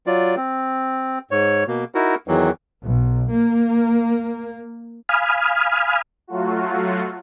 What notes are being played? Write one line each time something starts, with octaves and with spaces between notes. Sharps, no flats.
F#3 F4 D5
C4
G#2 C#5
B2 A#3
D#4 E4 F#4 A#4
E2 D#3 E3 F#3
B1
A#3
F5 G#5 B5 D#6 F6
F#3 A3 F4 F#4